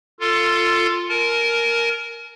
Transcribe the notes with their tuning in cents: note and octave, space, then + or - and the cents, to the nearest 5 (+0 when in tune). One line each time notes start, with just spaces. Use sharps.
F4 +0 A4 +20
A#4 +0 G#5 +45